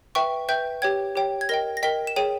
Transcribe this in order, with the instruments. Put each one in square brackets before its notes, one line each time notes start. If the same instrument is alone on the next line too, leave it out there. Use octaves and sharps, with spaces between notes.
[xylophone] B4 E5 G5 C#6
B4 E5 G5 G6
G4 C#5 G5 G#6
G4 C#5 G5
G#6
A#4 D#5 G5 A#6
A#6
A#4 D#5 G5 B6
E7
G#4 C#5 G5 D#7